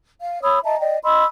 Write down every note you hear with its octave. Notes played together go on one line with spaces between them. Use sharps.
F5
C#5 B5 D#6 E6
D#5 E5 A5 A#5
D5 D#5 G5
D#5 B5 C6 E6